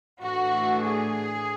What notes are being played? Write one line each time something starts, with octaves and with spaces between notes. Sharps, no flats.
A2 E3 A3 D4 F#4
G#4